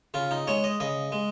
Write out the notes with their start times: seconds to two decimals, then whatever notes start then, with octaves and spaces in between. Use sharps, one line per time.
0.14 C#3 F4
0.31 D#4
0.47 G#3 C#5
0.64 D#5
0.80 C#3 D#5
1.12 G#3